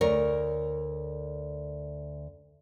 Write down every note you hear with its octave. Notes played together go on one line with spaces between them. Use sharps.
D2 A#4 C#5